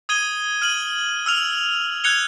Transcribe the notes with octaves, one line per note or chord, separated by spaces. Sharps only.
D#6 G#6 D#7 G7
F6 D#7 F#7
E6 F6 F7
F#6 G#6 C#7 F7 G7